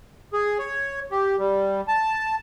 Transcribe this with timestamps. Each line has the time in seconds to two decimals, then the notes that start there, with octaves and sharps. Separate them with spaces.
0.33 G#4
0.59 C#5
1.11 G4
1.38 G3
1.88 A5